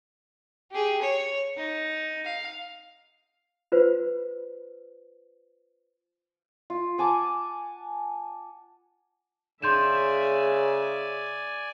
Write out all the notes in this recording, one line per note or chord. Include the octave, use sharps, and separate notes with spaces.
G4 G#4
C#5
D#4
F5
F4 B4 C5
F4
F#5 G#5 A5 D6
C#3 G#4 D5 E5 G#5 C6 G6 E7